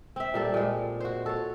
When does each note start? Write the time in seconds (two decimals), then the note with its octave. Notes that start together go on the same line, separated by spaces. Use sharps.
0.16 C4 E5
0.34 A#2 G3 A4
0.54 A#2 G#3
1.00 F#4 C5
1.26 A4 C#5